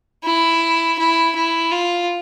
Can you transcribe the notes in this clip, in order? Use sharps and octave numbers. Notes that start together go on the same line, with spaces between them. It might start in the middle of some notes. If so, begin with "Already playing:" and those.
E4
E4
E4
F4